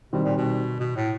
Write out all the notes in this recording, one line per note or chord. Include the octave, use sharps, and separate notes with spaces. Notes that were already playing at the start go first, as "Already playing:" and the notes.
B2 D#3 G3 C4
A#2
B2
B2
A2